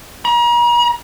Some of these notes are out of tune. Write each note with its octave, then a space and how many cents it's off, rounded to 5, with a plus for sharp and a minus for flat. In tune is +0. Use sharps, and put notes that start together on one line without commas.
A#5 +40